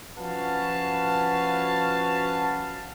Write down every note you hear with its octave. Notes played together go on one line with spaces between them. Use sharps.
F3 C#4 F#4 B4 F5 A5